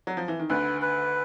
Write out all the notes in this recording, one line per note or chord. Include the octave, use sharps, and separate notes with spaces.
F#3
F3
E3
D#3
D2 D3 B4
B4